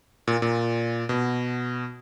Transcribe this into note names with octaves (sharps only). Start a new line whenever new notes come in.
A#2
A#2
B2